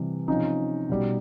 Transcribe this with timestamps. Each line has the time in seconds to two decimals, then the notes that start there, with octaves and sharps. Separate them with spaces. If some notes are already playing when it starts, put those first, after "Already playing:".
Already playing: C3 E3 G3
0.28 C3 F3 C#4 D#4
0.89 B2 G3